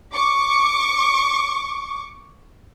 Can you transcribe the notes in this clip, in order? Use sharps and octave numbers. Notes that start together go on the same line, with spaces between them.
C#6 D6